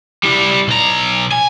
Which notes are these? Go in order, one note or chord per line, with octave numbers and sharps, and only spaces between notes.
G3 E4
B1 A#5
G#5